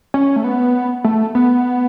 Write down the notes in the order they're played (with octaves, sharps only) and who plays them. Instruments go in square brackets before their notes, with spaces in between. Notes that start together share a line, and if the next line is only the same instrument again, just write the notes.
[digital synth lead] C#4
A3
B3
A3
B3